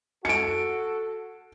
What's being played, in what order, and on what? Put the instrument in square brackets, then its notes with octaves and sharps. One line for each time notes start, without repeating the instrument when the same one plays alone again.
[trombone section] F#4 A4 [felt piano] C#7 D7